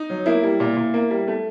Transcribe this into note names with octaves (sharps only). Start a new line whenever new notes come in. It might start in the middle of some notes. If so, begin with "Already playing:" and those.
Already playing: D#4
F#3
A#3 E4
G3
A#2
A#2
A#3
G3
A3